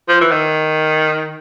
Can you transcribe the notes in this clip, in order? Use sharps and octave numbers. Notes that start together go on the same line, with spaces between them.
F3
E3
D#3